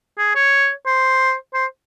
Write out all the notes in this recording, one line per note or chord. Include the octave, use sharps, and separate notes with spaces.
G#4
C#5
C5
C5